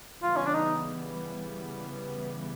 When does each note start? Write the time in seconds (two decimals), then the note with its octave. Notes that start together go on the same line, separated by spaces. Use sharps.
0.22 C#3 E3 G3 B3 F4
0.37 C#4
0.46 D4
0.54 D#4